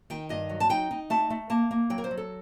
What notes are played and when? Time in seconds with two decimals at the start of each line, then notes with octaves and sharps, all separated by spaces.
0.10 D#3 G5
0.29 G2 D#5
0.49 F#3
0.60 A5
0.69 D#4 G5
0.91 D#4
1.10 A3 A5
1.30 A3
1.50 A#3 A5
1.71 A#3
1.90 F#3 G5
1.98 A#4
2.04 C5
2.11 F#3
2.17 A4